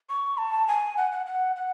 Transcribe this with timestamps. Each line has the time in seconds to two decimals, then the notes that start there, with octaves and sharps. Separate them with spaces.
0.09 C#6
0.38 A5
0.68 G#5
0.97 F#5
1.12 F#5
1.26 F#5
1.56 F#5